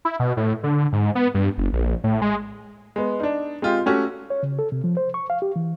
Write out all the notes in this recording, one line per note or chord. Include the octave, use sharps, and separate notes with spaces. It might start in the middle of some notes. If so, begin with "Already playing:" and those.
E4
B2
A2
D3
G#2
B3
G2
F#1
A#1
A2
G#3
G#3 B3
D4 D#4
G#3 C4 F4 G4
A3 C#4 F#4 G4
C#5
C#3
A4
C3
F3
C5
C#6
F5
G4
E3